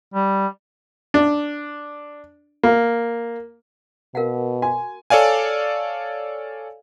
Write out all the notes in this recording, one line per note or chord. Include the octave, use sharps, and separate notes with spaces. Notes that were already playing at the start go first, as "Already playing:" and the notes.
G3
D4
A#3
B2 A#4 F5 F#5
F#4 G#5
A4 C#5 D5 F5 G#5